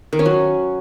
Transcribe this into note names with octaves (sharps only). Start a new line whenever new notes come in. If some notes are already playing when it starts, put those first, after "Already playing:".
D#3
C#4
F#3